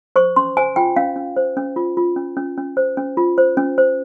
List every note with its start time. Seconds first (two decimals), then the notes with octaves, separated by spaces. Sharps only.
0.16 C5 C#6
0.36 C#4 C6
0.57 C5 G#5
0.76 F4 G5
0.96 C#4 F5
1.16 C#4
1.36 C5
1.57 C#4
1.76 F4
1.97 F4
2.16 C#4
2.37 C#4
2.57 C#4
2.77 C5
2.97 C#4
3.17 F4
3.38 C5
3.57 C#4
3.78 C5